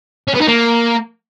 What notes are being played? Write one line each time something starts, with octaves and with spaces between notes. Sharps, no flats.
C#4
B3
D#4
A#3